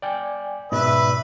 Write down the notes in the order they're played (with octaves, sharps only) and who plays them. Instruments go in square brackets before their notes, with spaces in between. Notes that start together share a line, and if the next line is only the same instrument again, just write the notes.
[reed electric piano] D5 G5 G#5
[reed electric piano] G#2 B2 D5 [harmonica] B4 E5